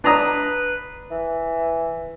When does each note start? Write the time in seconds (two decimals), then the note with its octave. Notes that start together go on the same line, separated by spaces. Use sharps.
0.04 D4 B4 A#5 D#6
1.11 E3